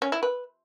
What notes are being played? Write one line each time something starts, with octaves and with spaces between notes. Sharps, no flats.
C#4
E4
B4